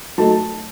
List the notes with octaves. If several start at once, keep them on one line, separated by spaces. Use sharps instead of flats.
F#3 A3 D#4 A5